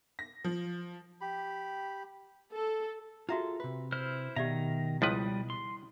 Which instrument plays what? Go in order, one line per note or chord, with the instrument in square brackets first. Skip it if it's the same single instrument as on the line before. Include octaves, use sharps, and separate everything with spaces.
[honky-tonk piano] A#6
F3
[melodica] G4 B5
[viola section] A4
[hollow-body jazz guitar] F4 G#4 A4 [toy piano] F#4 E5 A#5
[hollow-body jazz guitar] C3 B4
[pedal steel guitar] E4 C5 F6
[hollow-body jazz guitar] B2 [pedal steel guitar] D#3 A#5 [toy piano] G4 D5 E5
[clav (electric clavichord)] C#2 F3 B4 [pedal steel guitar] G3 D#6 [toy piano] E4
[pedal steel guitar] C6